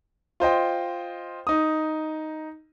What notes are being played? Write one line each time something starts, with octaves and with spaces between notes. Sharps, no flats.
F4 C5 D#5 G5
D#4 D#6